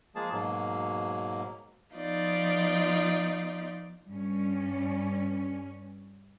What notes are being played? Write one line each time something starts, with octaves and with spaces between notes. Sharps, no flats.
F3 G#3 A#3 G#4 A5
G#2 B2 F#3 A#3
F3 B3 D#4 F4 D5
G2 C#4